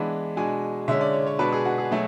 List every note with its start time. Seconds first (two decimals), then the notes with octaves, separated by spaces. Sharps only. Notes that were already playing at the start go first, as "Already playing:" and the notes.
Already playing: E3 G#3 B3 D4
0.37 B2 G#3 D4 G#5
0.88 D3 G#3 C#4 E5
1.01 D5
1.13 C#5
1.26 C#5
1.39 B2 G#3 D4 B4
1.52 G#4
1.65 F#4
1.78 G#4
1.91 B2 F#3 A3